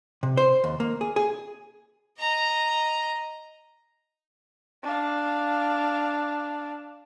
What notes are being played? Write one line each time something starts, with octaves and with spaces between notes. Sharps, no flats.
C3
C5
D#2
A#3
G#4
G#4
D#5 A#5
D4 F5